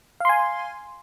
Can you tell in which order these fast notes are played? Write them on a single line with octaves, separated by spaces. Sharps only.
F5 C6 G#5